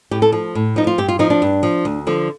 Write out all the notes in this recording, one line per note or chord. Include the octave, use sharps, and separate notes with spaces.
A2 G4
A4
F3
A2
F3 D#4
F4
G2 G4
F4
F3 D#4
D4
G2
F3
D2
D3 F3